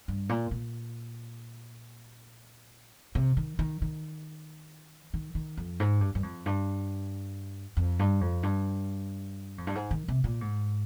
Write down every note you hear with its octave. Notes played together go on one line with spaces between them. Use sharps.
G2
A#2
A#2
C3
D#3
D#3
D#3
D#3
D#3
F2
G#2
G2
G2
F2
G2
F2
G2
F2
G2
F2
G2
G#2
D#3
C3
A#2
G#2